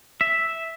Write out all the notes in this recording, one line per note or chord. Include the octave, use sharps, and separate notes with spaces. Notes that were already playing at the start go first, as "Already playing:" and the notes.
E5